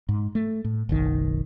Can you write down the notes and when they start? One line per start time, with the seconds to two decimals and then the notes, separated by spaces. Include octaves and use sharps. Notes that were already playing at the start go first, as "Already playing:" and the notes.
0.09 G#2
0.35 A3
0.64 A2
0.89 F#1 B1 D#3